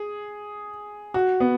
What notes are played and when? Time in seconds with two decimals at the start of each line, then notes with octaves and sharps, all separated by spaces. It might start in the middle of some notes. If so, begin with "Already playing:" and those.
Already playing: G#4
1.14 F#4
1.40 B3